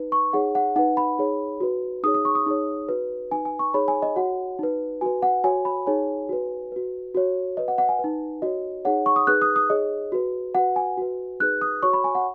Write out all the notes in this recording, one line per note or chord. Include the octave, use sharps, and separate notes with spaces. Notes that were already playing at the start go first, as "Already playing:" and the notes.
Already playing: D#4 B4
C#6
D#4 G#4 C#5 F#5
F#5
D#4 B4 F#5
B5
D#4 G#4 C#5
F#4 B4
D#4 G#4 C#5 D#6
D#6
C#6
D#6
D#4 G#4 C#5
F#4 B4
D#4 B4 G#5
G#5
C#6
D#4 G#4 C#5 B5
G#5
D#5
F#4 C#5 F#5
D#4 B4
F#4 B4 G#5
F#5
F#4 C#5 G#5
B5
D#4 G#4 C#5 G#5
F#4 B4
F#4 B4
F#4 C#5
F#4 B4 D#5
F#5
F#5
G#5
B4
D#4
F#4 C#5 D#5
D#4 G#4 C#5 F#5
C#6
D#6
D#4 G#4 B4 F#6
D#6
D#6
D#4 G#4 C#5 D#5
F#4 B4
F#4 B4 F#5
G#5
F#4 B4
D#4 G#4 B4 F#6
D#6
F#4 C#5 C#6
B5
G#5
F#5